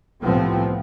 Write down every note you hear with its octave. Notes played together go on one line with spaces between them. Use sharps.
C2 A2 C3 F3 B3 C4